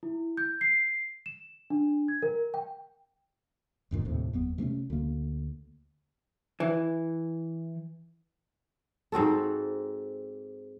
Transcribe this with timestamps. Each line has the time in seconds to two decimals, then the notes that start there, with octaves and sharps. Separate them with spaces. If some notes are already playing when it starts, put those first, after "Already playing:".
0.03 E4
0.37 G6
0.61 C7
1.26 E7
1.70 D4
2.08 G#6
2.22 A#4
2.54 G5
3.91 E1 G2 A#2 D#3
4.05 D#2 A2 C3
4.33 F#1 E2 B3
4.58 C3 A3 B3 C#4
4.90 D2 A#3
6.60 E3
9.12 G#2 C4 F#4 A4